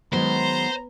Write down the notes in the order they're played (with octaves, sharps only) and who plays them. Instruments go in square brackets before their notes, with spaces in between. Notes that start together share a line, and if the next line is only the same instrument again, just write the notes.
[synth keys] D#3 F#3 G#3 [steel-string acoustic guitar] B3 [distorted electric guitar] C5 [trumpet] A#5